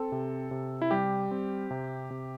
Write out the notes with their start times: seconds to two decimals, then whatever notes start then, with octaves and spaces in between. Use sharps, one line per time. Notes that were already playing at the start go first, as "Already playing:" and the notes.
Already playing: C4 A4
0.12 C3
0.51 C3
0.82 E4
0.91 G3 G4
1.31 C4
1.71 C3
2.11 C3